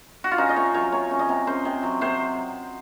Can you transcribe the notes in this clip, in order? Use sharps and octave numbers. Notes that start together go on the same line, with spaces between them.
F#4
F4
C#4 D#4
D#5
C3 C#5
F#3 C#5
C3 C#5
C#4
D#5
C3
C#4 C5
C3
F#3
C3 C5